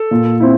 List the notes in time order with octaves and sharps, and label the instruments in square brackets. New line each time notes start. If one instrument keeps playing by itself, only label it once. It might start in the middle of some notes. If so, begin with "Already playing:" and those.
Already playing: [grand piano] A4
[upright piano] A#2
C4 E4